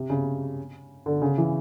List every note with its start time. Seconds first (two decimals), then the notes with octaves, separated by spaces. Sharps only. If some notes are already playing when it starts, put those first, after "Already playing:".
Already playing: C3
0.10 C#3
1.06 D3
1.22 C#3
1.38 E3